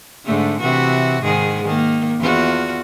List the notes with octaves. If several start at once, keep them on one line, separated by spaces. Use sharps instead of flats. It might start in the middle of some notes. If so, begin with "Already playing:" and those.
G#2 D3 A3
C3 E3 F#4
G#2 D#3 G#4
D#3 A#3
E2 F4 F#4